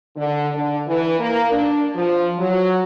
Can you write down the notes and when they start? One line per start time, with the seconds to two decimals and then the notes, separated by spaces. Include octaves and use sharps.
0.16 D3
0.54 D3
0.87 E3
1.19 A#3
1.52 D4
1.95 F3
2.38 F#3